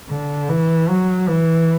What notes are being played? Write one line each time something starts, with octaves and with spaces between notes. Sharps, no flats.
D3
E3
F#3
E3